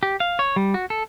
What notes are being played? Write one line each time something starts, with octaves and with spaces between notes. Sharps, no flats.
G4
F5
C#5
G3
F#4
A4